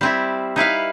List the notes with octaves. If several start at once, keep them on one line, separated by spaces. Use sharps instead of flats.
G3 C4 E4
D#4 E4 B4 F5